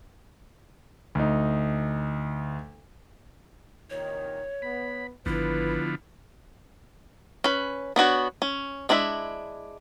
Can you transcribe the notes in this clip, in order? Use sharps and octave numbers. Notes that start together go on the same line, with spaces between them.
D2 D#4
C2 A#2 D#3 C#5
B3 B5
G#1 D3 F3 B3 E4 B4
C#4 B4
B3 D4 F#4 C#5
C#4
G#3 D4 E4 B4 E5